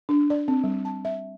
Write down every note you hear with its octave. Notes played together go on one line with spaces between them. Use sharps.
D4
D5
C4
G3
A5
E5